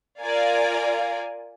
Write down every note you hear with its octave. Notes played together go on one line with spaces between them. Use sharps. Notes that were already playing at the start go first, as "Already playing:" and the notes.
F4 A#4 D5 F5 G#5